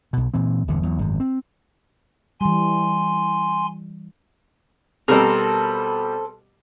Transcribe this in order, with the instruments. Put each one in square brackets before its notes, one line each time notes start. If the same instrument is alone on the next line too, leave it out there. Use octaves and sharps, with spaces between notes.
[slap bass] B1 B2
A#2 E3 C4
G1 E2 D3
E2 F#3
G#1 F#2
C4
[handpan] E3 G3 [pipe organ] G#5 C6
[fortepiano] B2 G3 [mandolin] C4 A4 A#4